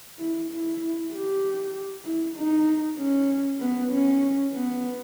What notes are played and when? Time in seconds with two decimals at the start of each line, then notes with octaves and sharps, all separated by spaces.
0.19 E4
0.51 E4
1.13 G4
2.05 E4
2.36 D#4
2.98 C#4
3.60 B3
3.92 C#4
4.54 B3